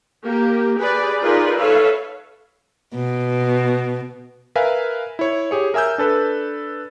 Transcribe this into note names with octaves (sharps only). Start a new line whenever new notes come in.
A#3 G4
G4 G#4 B4 D5
D#4 F4 G#4 A#4 B4 D5
A4 B4 C#5 E5 F5
B2
A#4 B4 E5 F5 G#5
E4 C#5
G4 G#4 C#5
A#4 E5 G#5 E6 G6
D4 A4 B4